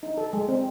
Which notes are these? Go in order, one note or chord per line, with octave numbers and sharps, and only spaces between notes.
D#4
A4
G#3
C4